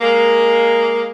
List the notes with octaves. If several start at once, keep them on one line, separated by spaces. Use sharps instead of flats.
G#3 A#3